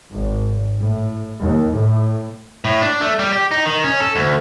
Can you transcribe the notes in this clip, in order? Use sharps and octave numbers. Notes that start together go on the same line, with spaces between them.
G#1
A2
D#2
A2
A2
D4
A3
G3
G4
D#4
D#3
C#4
A4
D2